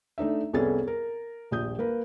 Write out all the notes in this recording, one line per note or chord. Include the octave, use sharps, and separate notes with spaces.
A3 D4 D#4 E5
C2 B3 C#4 G#4 A4 A6
A#4
D#1 A#1 D#6 G6
A#3 A#4 B4